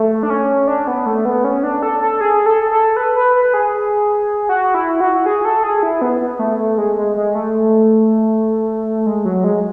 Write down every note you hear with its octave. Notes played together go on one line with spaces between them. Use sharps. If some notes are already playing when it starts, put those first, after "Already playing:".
Already playing: A3
D4
C#4
D4
B3
A3
B3
C#4
D4
A4
A4
G#4
A4
A4
B4
B4
B4
G#4
F#4
E4
F#4
G#4
A4
G#4
E4
B3
B3
A3
A3
G#3
G#3
G#3
A3
G#3
F#3
G#3